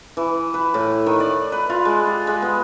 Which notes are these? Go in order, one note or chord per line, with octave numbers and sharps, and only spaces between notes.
E3
B4
A2
D#3
D5
B4
F4
G#3
G4
G#3
B3